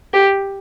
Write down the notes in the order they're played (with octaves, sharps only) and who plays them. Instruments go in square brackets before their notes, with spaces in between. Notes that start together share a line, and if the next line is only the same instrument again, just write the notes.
[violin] G4